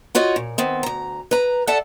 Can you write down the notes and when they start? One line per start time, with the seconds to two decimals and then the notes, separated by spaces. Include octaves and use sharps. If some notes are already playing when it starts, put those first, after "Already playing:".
0.15 F4 F#4 C#5 D#5
0.36 A#2
0.58 D#3 B3 C4
0.83 D2 A#5
1.31 B4 A#5
1.67 A4 D5 E5 F#5 A5